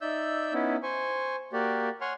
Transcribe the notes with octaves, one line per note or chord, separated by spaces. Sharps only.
D#4 D5 E5 E6 G6
B3 C#4 D#4 E4
C5 G#5 C#6
A#3 F#4 G4 D5
C#5 F#5 G#5 C6 C#6 F6